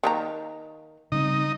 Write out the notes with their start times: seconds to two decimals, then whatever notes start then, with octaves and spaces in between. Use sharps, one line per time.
0.03 D#3 A#3 A#5
1.12 C#3 G3 C4 D#4 D#5